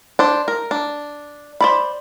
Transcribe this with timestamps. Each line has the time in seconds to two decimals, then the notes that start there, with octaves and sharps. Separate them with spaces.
0.19 D4 C5
0.48 A#4
0.71 D4
1.61 C5 D5 B5